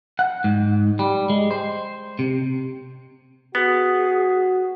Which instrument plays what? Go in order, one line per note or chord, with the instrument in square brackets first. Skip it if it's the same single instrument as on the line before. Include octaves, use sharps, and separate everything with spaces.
[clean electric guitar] F#5
G#2
G3
G#3
C5
C3
[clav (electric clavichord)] B3 [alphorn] F#4 [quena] G#4